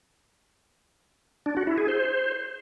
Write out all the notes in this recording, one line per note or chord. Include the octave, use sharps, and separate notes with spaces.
D4
F#4
E4
G#4
C5